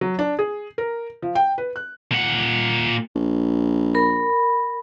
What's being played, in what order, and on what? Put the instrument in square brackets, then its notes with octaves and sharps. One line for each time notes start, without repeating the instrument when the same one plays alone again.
[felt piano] F#3
D4
G#4
A#4
F3
G5
B4
F#6
[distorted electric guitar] A#2 F#5
[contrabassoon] A#1
[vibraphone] A#4 B5